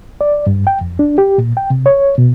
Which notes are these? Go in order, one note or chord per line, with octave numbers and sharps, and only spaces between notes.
D5
G2
G5
F2
D4
G4
A#2
G5
C3
C#5
B2